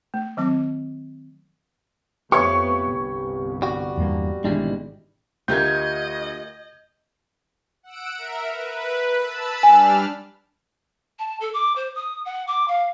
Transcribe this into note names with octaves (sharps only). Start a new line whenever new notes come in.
A3
D#3 F#3 C4 D6
F2 A3 B3 G4 B4 C#5 C#6
G1 C2
G3 F#4
E2 G2 A#3
G#1 B2 E3 G3 G#3 D4
D2 F4 G4 A#4 D#5 G6 G#6
F#5 E6 D7
A#4 E5
B4
A5 B5 E6
G3 D4 G#5 F6
A5
A4
D6
C5
D#6
F#5
D6
F5